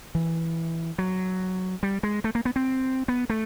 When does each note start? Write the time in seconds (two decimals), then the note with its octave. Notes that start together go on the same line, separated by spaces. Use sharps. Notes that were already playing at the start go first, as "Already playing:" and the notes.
0.15 E3
0.98 F#3
1.83 G3
2.03 G#3
2.24 A3
2.35 A#3
2.45 B3
2.56 C4
3.08 B3
3.30 A3